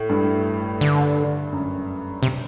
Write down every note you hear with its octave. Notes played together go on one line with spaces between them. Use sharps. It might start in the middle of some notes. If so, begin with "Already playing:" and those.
Already playing: A2
G2
D3
F#2
C3